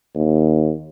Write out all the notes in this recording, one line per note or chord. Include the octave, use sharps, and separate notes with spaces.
D#2